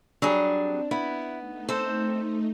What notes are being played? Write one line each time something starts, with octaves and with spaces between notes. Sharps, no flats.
F#3 G3 D4 G#4
C4
B3 E4 F#5
A3 D#4
C4 A4 C5